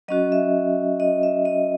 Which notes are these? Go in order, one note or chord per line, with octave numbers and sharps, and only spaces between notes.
F#3 C#4 F#4 D#5
E5
D#5
E5
D#5